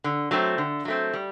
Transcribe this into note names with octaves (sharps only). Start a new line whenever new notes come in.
D3
F#3 A3 C4
D3
F#3 A3 C4
G3